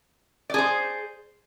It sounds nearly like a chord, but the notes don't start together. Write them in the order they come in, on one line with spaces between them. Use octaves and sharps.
D5 G#4 C5